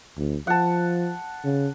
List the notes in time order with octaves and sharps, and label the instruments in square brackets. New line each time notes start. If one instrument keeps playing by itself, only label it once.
[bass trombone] D2
[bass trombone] F3 [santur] F#5 A5
[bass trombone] C#3